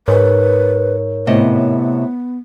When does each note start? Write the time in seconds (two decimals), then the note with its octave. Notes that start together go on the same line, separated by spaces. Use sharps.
0.08 G#2 A#4 B4 C#5
1.27 A2 C3 B3 D#5